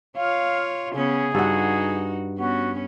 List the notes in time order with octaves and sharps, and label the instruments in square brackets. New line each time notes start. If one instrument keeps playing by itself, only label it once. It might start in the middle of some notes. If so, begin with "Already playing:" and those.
[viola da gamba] F4 C#5 [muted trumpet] F5
[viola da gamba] C#3 B3 C#4 [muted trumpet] G#4
[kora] G2 F#5 [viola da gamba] D#4 F#4
[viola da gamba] B3 C#4 [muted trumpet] F#4